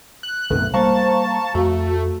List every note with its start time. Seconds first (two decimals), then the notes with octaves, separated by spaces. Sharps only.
0.23 F#6
0.50 A#1 F#2 C3 D#3 A3 B3
0.74 G3 A#3 C5 F5 A5 A#5 C#6
1.55 F2 A3 F#4